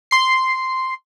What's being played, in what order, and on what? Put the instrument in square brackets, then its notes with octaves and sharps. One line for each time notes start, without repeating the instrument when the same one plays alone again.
[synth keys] C6 C7